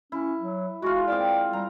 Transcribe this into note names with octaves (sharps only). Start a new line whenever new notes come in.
C#4 E4
F#3
G#3 F4 F#4
C4 F4 D5 G5
G3 A#5